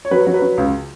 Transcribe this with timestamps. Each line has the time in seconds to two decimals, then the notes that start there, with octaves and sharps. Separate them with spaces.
0.05 C#5
0.11 F#3 B4
0.27 F#3
0.34 B4
0.42 F#3
0.58 C#2